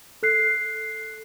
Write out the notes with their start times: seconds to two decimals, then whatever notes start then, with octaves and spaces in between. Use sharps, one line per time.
0.23 A4 F#6 C7